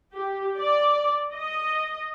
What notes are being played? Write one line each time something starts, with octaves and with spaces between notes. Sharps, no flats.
G4
D5
D#5